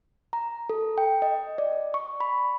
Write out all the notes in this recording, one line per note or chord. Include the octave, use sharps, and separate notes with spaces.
A#5
A4
G5
D#5
D5
C#6
B5